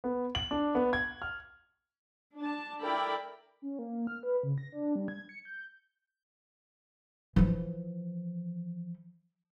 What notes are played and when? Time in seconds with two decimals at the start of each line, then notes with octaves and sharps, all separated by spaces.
0.04 B3
0.35 F#7
0.51 D4
0.75 B3
0.93 G#6
1.22 F6
2.38 D4 A5
2.83 E4 A4 A#4 D5 G5 B5
3.62 C#4
3.79 A#3
4.07 F6
4.23 B4
4.43 C#3
4.58 A#6
4.72 D4
4.96 G3
5.08 G#6
5.29 C#7
5.45 G6
7.36 E3 F3